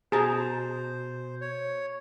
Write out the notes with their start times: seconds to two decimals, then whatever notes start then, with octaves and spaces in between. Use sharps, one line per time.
0.12 B2 G#4 C5 A5 A#5
1.41 C#5